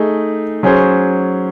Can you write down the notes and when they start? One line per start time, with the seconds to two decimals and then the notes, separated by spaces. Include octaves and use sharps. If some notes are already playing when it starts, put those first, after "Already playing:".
Already playing: A3 D#4 G#4
0.63 F#3 C#4 G#4 C5